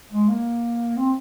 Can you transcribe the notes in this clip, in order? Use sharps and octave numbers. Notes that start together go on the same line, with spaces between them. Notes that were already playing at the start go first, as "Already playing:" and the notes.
G#3
A#3
C4